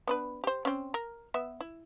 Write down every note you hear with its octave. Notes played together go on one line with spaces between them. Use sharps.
B3 D4 B4
G4 C5
C4 C#4
A#4
B3 E5
E4